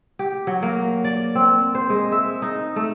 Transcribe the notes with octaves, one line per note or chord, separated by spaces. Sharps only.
G4
F#3
A#3
D5
C4
C5
G#3
E5
D#4
A3